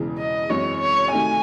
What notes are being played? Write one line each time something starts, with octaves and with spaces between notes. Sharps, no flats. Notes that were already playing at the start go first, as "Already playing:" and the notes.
Already playing: E1 E2 C#3 E3
D#5
F#2 E3 G#3 C4 F#4 C#5
C#5
C3 D#3 A3 D#4 F#4 G#5